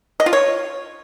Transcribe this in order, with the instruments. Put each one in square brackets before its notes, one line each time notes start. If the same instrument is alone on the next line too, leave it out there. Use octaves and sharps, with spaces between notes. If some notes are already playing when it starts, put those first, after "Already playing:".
[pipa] D#5
F4
C#5